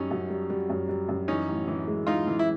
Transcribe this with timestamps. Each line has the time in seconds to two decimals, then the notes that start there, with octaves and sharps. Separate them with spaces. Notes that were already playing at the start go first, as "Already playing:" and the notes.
Already playing: F#2 G3 C#4 D#4
0.11 F#2
0.30 G3
0.50 G3
0.70 F#2
0.89 G3
1.09 F#2
1.28 E3 C#4 D#4
1.49 A1
1.68 E3
1.87 G#3
2.07 G#3 D#4 F4
2.27 E3
2.39 E4